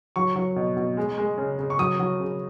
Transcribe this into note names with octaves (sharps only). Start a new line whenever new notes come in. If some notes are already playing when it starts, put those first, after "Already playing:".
F#3 C#6
F#3
B2
B2
G#3
G#3
C#3
C#3
C#6
F#3 D#6
F#3
C#3